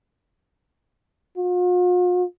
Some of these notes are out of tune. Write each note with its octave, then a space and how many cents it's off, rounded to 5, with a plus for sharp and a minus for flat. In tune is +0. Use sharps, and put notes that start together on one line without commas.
F4 +45